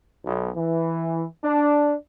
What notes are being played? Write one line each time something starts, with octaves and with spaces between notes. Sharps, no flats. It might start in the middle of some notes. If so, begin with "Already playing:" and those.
B1
E3
D4